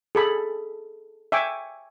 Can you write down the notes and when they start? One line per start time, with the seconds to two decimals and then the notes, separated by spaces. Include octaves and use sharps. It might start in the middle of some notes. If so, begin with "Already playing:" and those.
0.15 G#4 A4 B5
1.32 E5 G5 G#5 C#6 D6